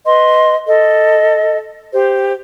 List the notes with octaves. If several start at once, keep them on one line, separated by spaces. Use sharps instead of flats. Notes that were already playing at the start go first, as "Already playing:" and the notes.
B4 D#5 C6
A4 D#5
G4 C5